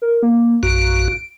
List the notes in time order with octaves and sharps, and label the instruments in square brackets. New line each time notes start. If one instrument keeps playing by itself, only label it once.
[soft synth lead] A#4
A#3
[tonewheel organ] A#1 F#2 F#4 [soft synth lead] D7